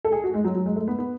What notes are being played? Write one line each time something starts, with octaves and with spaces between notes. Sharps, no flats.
A4
G#4
F#4
G#3
F#3
F#3
G#3
A3
B3
B3